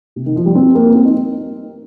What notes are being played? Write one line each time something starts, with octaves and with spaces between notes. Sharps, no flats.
C3
D#3
F3
G3
C4
A#3
C4
D#4